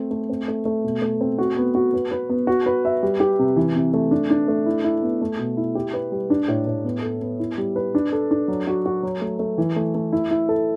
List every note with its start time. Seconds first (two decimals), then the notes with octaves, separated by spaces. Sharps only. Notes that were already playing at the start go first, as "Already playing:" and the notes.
Already playing: A3 C4
0.11 A3
0.29 C4
0.48 A3
0.65 A3
0.84 B2
1.02 A3
1.21 C4
1.38 F#4
1.57 B3
1.75 F#4
1.94 B4
2.12 B4
2.30 B3
2.47 F#4
2.66 B4
2.85 E5
3.03 G3
3.20 G4
3.39 C3
3.56 E3
3.76 C3
3.94 A3
4.11 D4
4.30 D4
4.48 A3
4.66 E4
4.84 E4
5.03 B3
5.22 A3
5.39 B2
5.57 E4
5.75 G4
5.94 B4
6.12 G3
6.30 D4
6.48 A2
6.67 A2
6.85 B3
7.03 A4
7.21 B3
7.39 E4
7.58 G3
7.76 B4
7.95 D4
8.13 A4
8.31 D4
8.48 F#3
8.67 F#4
8.86 F#4
9.03 F#3
9.21 A3
9.39 A3
9.58 E3
9.76 A3
9.95 A3
10.12 E4
10.31 E4
10.49 A4